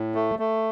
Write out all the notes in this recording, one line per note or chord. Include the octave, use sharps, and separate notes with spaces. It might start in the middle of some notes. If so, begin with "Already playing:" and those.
Already playing: A2
A3
A3